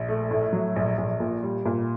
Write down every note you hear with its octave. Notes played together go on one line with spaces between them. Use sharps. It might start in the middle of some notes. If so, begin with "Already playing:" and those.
Already playing: A#1
A3
A2
F#3
A#1
A#1
A#2
G3
A#2